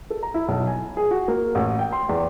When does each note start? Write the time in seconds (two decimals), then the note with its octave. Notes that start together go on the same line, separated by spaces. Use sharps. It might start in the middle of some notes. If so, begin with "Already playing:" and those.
0.10 A4
0.23 A#5
0.34 E4
0.48 B1
0.67 G#5
0.97 G#4
1.11 F#4
1.28 A#3
1.55 A1
1.79 G5
1.92 C6
2.09 E2